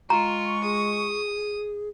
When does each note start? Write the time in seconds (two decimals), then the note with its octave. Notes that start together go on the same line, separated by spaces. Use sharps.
0.10 G#3 F4 A#5 C#6
0.63 G#4 D#6